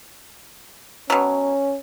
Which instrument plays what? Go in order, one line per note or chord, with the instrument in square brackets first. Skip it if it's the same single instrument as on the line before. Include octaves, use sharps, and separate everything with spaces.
[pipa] B2 F#3 [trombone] C#4